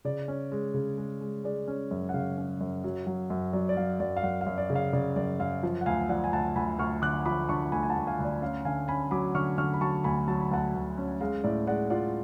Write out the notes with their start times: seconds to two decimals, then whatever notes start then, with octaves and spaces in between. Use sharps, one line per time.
0.05 C#3 D5
0.28 C#4
0.52 G#3
0.74 C#3
0.98 G#3
1.21 G#3
1.44 G#3 D5
1.68 C#4
1.91 F#2
2.09 F#5
2.14 C#3 F5
2.37 C#4
2.61 F#2
2.84 F#3
3.07 F#3
3.30 F#2
3.53 F#3 D5
3.69 D5
3.77 F#3 F5
4.00 F#2 D5
4.17 F5
4.23 F#2 D5 F#5
4.41 F5
4.47 F#2
4.58 D5
4.70 C#3
4.75 F5
4.93 C#3 D5
5.16 F#2 D5
5.40 F#2 F5
5.63 F3
5.81 F#5
5.86 D2 F5 G#5
6.09 F3 D5 F#5
6.24 G#5
6.33 D2 F#5 A5
6.56 D2 G#5 B5
6.79 D2 C#6 F6
7.02 D3 D6 F#6
7.25 F3 B5 D6
7.48 D3 A5 C#6
7.72 D2 G#5 B5
7.83 G#5
7.90 F#5 A5
7.96 D2
8.07 F5 G#5
8.19 D2
8.24 D5
8.42 C#4 F5
8.65 D3 F5 G#5
8.88 C#4 G#5 B5
9.11 F#3 B5 D6
9.35 D3 C#6 F6
9.58 D3 C#6 F6
9.74 B5
9.81 F#3 A5 C#6
10.04 D2 G#5 B5
10.28 F#3 A5
10.41 B5
10.51 D2 F#5 A5
10.74 D2
10.98 C#4
11.21 G#3 F5
11.44 A2 D5
11.67 G#3 D5 F#5
11.90 F4 D5 F#5